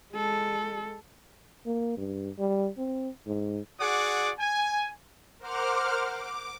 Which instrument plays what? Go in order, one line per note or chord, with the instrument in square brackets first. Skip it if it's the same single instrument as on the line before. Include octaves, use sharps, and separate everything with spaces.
[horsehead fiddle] G#3 A4
[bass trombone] A#3
G2
G3
C4
G#2
[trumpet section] F#4 G#4 D5 F#5 D6
G#5
[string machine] A#4 C5 F#5 D6 F6
D6